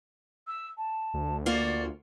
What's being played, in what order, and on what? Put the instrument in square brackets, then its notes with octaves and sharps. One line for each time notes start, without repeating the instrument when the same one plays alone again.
[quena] E6
A5
[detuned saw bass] D2
[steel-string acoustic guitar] A#3 F4 F#4 [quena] D5